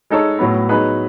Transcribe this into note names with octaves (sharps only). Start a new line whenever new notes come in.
G#3 D#4 A4 C#5
A2 F#3 B3
F#3 B3 D#4 G#4 B4